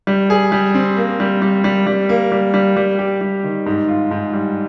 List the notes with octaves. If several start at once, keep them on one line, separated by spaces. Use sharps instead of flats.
G3
G#4
G3
C4
A#3
G3
G3
G3
G3
A#3
G3
G3
G3
G4
G3
D#3
G#2
F4
G#2
G3